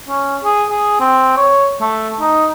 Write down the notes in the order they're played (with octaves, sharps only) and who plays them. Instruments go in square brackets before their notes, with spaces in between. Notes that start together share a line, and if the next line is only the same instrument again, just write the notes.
[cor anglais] C#4
G#4
G#4
C4
C#5
A3
D#4